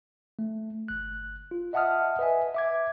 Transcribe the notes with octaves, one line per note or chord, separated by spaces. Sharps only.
A3
G1 F#6
F4
D#5 E5 F#5 A5 D#6 F6
B4 D#5 E5 G#5
E5 D6 G#6